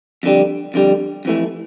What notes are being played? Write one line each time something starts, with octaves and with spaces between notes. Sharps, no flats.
F2 D3 G3
F2 D3 G3
F2 E3 A3